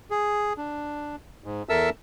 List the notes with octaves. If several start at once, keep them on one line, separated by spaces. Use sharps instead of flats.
G#4
D4
G#2
E2 A4 A#4 E5 A5 E6